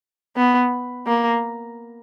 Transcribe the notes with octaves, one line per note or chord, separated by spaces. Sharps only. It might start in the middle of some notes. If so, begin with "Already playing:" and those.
B3
A#3